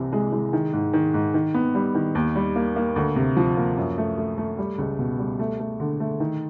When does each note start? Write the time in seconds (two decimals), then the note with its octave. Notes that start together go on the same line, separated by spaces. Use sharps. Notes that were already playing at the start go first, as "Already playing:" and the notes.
Already playing: C2 C3 E3
0.13 G#3
0.33 G#3
0.53 D#3
0.73 G#2
0.93 D#3
1.14 G#2
1.34 D#3
1.54 B3
1.75 G3
1.95 D#3
2.15 D#2
2.36 G3
2.56 A#3
2.76 A#3
2.96 D2
3.16 C3
3.37 F3
3.57 A#3
3.77 F#2
3.98 A3
4.18 A3
4.38 A3
4.58 G3
4.78 C#2
4.99 B2
5.19 G3
5.39 A3
5.60 A3
5.80 D3
6.00 A3
6.20 D#3